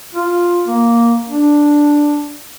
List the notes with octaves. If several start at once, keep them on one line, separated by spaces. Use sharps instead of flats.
F4
A#3
D4